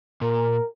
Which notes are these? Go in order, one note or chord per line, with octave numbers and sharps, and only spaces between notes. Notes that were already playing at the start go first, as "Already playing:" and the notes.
A#2 A#4